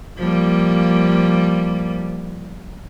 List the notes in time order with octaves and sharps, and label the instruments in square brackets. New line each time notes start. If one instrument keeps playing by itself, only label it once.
[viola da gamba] F3 G3 A#3